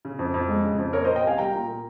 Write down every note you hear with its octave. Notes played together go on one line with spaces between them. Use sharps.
C#3
F2
F2
G#3
C#3
F2
A#2 A#4 C#5
C5 D#5
A#3
D#5 G5
C2 F5 G#5
G3 G5 A#5
A#2
A#3